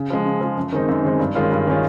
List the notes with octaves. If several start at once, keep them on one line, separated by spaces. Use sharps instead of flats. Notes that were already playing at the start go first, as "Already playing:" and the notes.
Already playing: C#3
F3 G#3
C#3
F3 G#3
F#2
D#3 G#3 C4 D#4
F#2
D#3 G#3 C4 D#4
G2
D#3 G#3 C#4 F4
G2
D#3 G#3 C#4 F4